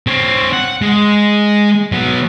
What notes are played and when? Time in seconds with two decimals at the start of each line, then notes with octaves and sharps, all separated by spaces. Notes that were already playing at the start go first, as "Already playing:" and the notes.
0.07 C4 C#5
0.53 F#5
0.82 G#3
1.92 F#3 B3